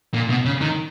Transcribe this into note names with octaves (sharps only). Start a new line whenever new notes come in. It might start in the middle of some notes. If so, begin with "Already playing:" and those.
A#2
B2
C#3
D#3